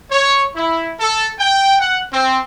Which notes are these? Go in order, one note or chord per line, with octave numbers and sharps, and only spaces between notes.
C#5
E4
A4
G5
F#5
C4